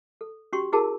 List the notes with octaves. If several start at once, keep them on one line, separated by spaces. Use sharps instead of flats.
A4
C#4 F#4 G4 C6 C#6
E4 F#4 G#4 A#4 A5 E6